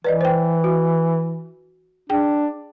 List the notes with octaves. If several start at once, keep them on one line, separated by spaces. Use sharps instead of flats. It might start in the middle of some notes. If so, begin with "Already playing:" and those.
E3 B4 D5 D#5
C5 G5
F#4
D4 G#4 G5